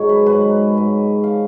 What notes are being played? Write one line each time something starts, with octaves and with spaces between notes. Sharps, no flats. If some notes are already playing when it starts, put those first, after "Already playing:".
Already playing: G#2 D#3 F#3 G#4 C#5
B4
G#2 F#3 B4
G#2 F#3
F3 F5